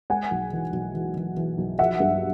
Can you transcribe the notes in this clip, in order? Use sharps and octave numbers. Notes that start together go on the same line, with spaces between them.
G#3 F#5 G#5
B1
E3
B1
E3
E3
E3
B1
F3 E5 F#5
G2